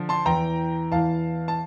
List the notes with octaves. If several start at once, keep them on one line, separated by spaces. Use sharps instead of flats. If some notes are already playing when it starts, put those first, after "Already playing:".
Already playing: D3 F3
A5 C6
E2 E3 G5 A#5
E2 E3 F5 A5
A5